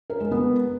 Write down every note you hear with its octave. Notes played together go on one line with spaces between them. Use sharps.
A#4
G#3
B3